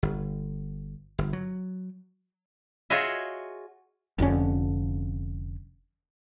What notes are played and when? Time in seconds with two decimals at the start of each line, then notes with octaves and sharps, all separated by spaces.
0.03 G1
1.18 G1
1.33 F#3
2.90 F4 F#4 G#4 C#5 D#5 E5
4.19 F1 F2 D3 C#4